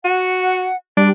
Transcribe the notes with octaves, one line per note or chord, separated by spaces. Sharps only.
F#4 F#5
G3 D4